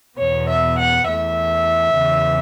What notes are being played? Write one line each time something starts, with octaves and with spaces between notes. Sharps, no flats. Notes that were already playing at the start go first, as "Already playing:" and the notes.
E2 B2 B3 C#5
E5
F#5
E2 E3 A3 E5
E2 C#3 E3